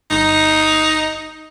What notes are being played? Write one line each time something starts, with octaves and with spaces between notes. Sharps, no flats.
G1 D#4